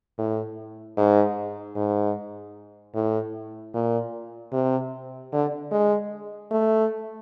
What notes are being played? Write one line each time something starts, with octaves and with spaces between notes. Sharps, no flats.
A2
G#2
G#2
A2
A#2
C3
D3
G#3
A3